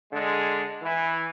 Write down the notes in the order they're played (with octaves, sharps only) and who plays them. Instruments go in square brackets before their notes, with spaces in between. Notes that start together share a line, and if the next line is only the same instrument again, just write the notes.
[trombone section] D3 G#3
E3